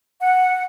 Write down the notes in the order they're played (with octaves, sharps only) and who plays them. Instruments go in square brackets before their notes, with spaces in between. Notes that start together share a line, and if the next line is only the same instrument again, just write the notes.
[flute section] F#5